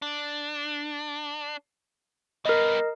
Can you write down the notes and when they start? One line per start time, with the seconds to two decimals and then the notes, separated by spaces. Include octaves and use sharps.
0.02 D4
2.45 G3 B3 A#4 D#5